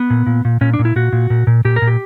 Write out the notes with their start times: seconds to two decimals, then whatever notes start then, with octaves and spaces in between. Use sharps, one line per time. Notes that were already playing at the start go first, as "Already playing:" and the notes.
Already playing: B3
0.10 A#2
0.27 A#2
0.45 A#2
0.61 A#2 C#4
0.74 D4
0.79 A#2
0.85 E4
0.96 A#2 F#4
1.13 A#2
1.30 A#2
1.47 A#2
1.65 A#2 G4
1.76 A#4
1.82 A#2
1.87 G4